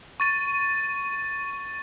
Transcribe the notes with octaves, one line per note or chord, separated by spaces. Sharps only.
C#6 A6 D#7